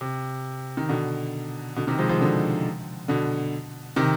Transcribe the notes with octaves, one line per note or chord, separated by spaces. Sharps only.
C3
D#3
B2 D3
B2 D3
C3 D#3
F3 G#3
F3 G#3
B2 D3
B2 D3
C3 D#3